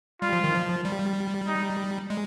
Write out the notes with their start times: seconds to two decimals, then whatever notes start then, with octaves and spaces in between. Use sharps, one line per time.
0.22 G3 F4
0.33 F3
0.44 D#3
0.55 F3
0.85 G3
1.47 D#4
2.10 G#3